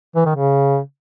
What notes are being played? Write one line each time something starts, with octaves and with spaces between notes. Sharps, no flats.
E3
D#3
C#3